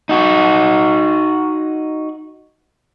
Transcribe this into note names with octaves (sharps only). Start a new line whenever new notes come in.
D#4 F#4